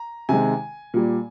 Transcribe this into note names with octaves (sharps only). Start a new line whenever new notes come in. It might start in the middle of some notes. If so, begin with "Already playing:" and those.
Already playing: A#5
C3 D#3 G#3 G#5
A#2 G3